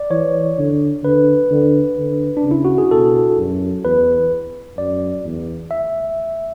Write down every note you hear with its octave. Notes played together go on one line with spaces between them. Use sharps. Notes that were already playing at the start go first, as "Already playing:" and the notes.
Already playing: D5
E3 C#5
D3
D3 B4
D3
D3
D4
C#3
E4
F#4
G#4
B2 A4
F#2
E2 B4
F#2 D5
E2
E5